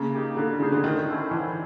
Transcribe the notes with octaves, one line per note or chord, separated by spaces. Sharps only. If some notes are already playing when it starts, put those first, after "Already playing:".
Already playing: C#3 A#3
D#4 G4
D3 A#3
C#3 D#4 G#4 C5
D3
D#3 A3
C#4 E4 A4 C5
D3 E3